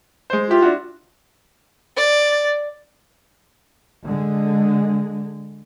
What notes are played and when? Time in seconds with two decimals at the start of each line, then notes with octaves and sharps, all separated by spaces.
0.30 G#3 C5
0.50 E4 F4 G4
0.62 D4 E4 F#4
1.96 D5
4.05 D3 G#3